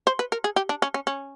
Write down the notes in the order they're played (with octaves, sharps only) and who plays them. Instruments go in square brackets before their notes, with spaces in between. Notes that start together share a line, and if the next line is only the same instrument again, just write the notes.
[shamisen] C5
B4
A#4
G#4
G4
D4
C#4
C#4
C#4